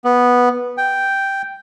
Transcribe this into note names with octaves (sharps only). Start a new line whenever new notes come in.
B3
G5